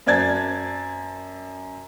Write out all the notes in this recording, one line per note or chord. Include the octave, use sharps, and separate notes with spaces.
F#2 C5 D5 A5 G#6 A6